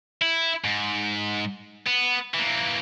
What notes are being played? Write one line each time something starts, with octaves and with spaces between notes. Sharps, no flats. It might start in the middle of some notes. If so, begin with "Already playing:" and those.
E4
G#2
B3
E3 A#3